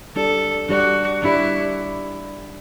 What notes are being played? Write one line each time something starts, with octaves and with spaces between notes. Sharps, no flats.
G3 D4 G4 A4 D5
G3 D4 F#4 G4 D5
G3 D4 E4 G4 D5